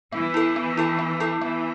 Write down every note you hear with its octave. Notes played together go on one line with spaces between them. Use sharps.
E3 B3
E4 A4
B3
E4 A4
B3
E4 A4
E3 B3